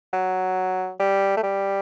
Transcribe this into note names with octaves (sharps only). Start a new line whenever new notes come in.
F#3
G3
A3
G3